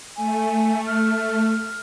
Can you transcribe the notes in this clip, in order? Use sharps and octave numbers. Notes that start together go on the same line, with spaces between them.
A3 G#5
F6